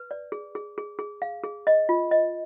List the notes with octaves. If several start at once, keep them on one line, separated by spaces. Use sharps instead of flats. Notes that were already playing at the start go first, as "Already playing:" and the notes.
Already playing: B4
D5
G#4
G#4
G#4
G#4
F5
G#4
D#5
F4
D#5